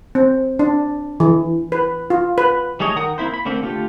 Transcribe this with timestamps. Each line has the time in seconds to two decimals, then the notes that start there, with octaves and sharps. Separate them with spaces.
0.15 C4
0.59 D4
1.20 E3
1.72 B4
2.10 F4
2.38 B4
2.80 G3 A3 G#4 C#5 D#5
2.96 D#3 A#4 F#5 G5 D#6
3.18 A#3 C4 E4 C5
3.34 B5
3.45 D3 A3 A#3 C4
3.62 D3 A3 F4 G4